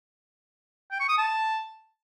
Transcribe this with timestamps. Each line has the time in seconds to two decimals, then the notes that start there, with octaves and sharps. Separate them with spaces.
0.91 G5
1.00 C#6
1.09 D#6
1.18 A5